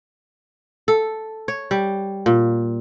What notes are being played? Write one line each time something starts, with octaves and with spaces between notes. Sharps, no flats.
A4
C#5
G3
A#2